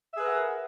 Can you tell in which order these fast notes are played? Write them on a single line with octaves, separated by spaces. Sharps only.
E5 G#4 B4 A#4 F#5